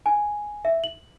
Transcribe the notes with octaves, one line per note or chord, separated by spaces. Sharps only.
G#5
E5
F#7